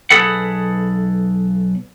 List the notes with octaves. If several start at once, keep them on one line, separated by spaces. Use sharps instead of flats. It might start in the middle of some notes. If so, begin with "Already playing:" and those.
B1 G#4 A4 B4 F#5